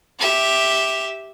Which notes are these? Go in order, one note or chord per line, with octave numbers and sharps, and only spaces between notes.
G4 E5